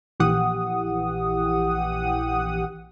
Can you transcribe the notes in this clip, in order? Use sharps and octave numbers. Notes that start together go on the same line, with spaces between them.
A#1 E3 G4 F#5 D#6